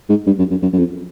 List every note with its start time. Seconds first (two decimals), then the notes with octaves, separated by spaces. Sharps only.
0.09 G#2
0.27 G2
0.39 F#2
0.51 F#2
0.62 F#2
0.73 F#2
0.79 F2